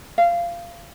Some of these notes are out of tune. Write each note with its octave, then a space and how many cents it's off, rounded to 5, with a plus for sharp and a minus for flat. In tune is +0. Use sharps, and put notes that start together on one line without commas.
F5 -20